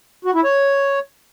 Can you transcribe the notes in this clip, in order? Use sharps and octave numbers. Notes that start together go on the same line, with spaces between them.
F#4
E4
C#5